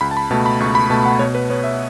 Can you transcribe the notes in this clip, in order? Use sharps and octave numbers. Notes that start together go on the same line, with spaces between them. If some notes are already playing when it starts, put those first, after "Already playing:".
C#2 B5
A5
B5
B2 A3 A5
B5
C#2 C#6
B5
B2 A3 A5
F#5
B2 C#5
B4
B3 C#5
E5